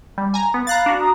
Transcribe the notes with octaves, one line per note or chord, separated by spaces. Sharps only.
G3
G#5 A#5
B3
F5 A#5 B5 F#6 A6
D4 F#4
A#5 D#6